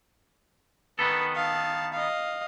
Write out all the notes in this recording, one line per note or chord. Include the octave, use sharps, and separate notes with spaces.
D#3 B3 A4 B4
F5 A5
D#5 F5